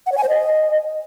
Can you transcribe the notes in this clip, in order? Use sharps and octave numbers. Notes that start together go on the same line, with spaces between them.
F#5
C#5
G#5
C5
D#5